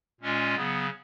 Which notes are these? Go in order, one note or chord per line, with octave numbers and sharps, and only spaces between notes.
A#2 G#3 C#4 F4
C#3 F#3 B3